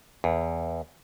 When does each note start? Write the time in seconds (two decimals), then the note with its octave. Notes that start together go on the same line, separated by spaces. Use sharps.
0.24 E2